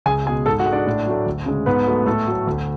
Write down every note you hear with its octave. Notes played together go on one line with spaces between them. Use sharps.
C#2 G#4 G#5
B2 G#3 G#4 G#5
G#2 A4 A5
F#4 F#5
G#3
D4 D5
A2
F#3 A3
D2
C#3 G#3
G#2 B3 B4
F#3 A3
A2 A3 A4
F#3 A3
D2